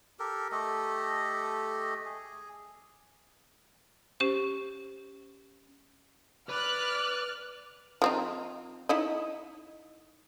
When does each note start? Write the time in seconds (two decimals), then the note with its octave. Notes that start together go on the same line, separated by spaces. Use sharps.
0.19 G4 A4 A#4
0.52 A3 G4 A4 D#5
2.06 G#4
4.20 C#4 G4 C5
6.49 B4 D5 B5 F6 F#6
8.02 F3 C4 D#4
8.89 D#4 E4 D#5